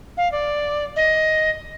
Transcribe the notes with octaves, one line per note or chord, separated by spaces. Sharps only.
F5
D5
D#5